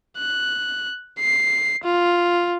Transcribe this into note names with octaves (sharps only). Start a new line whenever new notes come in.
F#6
C7
F4